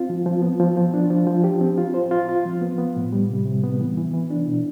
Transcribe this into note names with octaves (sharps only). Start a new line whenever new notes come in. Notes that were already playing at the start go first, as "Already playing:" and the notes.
Already playing: C4 F4
F3
F3
B3
F3
F3
D4
F3
F3
G4
C4
F4
C5
F4
F4
F3
B3
B3
A2
G3
C3
C3
B3
E3
E3
E3
D4
B2